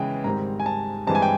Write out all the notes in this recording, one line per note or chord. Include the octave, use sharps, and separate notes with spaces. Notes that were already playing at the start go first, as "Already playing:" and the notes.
Already playing: C#3 E3 G#3 B3 G5
G#2 D#3 G3 C4 A#5
G#5
A5
G2 E3 G#3 C4 A5
G#5
G5